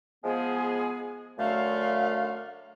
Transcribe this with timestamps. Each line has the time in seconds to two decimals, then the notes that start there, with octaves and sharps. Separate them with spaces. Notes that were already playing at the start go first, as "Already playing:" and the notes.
0.24 F3 G#3 B3 G#4
1.39 F#2 D3 A3 F5